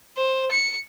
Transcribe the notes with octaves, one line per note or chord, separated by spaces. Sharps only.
C5
C#7